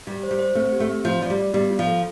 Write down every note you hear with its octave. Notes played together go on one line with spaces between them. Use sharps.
G3 G4
C5
G3
C5
A3 C4
G4
A3
C4
F3 F4
F3 D5
G3
D5
G3 B3
F4
F3
A4